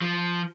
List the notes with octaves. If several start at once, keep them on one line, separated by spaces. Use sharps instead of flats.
F3